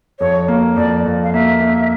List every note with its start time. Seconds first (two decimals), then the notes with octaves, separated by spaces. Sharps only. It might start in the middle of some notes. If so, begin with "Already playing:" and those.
0.19 F2 C#5
0.48 A#3
0.76 F2 D5
1.05 F2
1.23 F5
1.33 A#3 E5
1.61 A#3